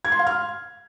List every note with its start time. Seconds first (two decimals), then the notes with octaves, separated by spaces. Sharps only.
0.05 G#6
0.12 C6
0.19 F5
0.27 F6